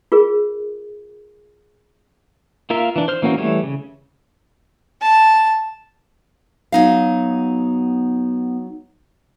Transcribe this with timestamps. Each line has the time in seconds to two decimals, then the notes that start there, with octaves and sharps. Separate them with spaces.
0.12 F4 G#4 A#4
2.70 A#3 F4 A#4 E5
2.96 E3 D4
3.08 C5 F6
3.22 E3 A#3 C#4 F#4
3.38 E3 G3 A3 C#5
3.63 C#3
5.02 A5
6.72 F#3 B3 D#4 F5